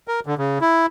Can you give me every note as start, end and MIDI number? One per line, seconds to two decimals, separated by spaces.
0.08 0.20 70
0.26 0.35 50
0.38 0.58 49
0.61 0.86 64